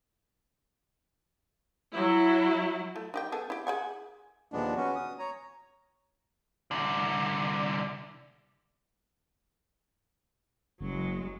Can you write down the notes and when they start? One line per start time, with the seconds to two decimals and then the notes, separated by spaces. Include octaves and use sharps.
1.91 F#3 E4
2.96 A3
3.14 D#4 G4 G5
3.32 B3 G#4 A4
3.50 E4 G4
3.67 G#4 F#5 G#5
4.52 D#2 A#2 F3 G#3 B3 D4
4.77 B3 C#4 F#4
4.96 D#6
5.19 C#5 A#5
6.71 C2 D3
10.80 F#1 F#3 G#3